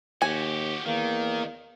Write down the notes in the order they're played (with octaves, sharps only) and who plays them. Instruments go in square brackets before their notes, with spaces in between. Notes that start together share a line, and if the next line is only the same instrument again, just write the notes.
[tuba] D#2 [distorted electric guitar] F#4 G4 [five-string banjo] G#5
[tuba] E2 [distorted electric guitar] D#3 [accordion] A#3